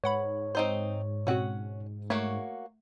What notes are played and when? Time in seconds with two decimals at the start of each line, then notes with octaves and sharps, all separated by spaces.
0.04 G#2 B4 C#5 F#5 B5
0.55 C4 D#4 C5
1.27 B2 C4 C#4 F#4 F#5
2.10 A3 A#3 F#4 C#5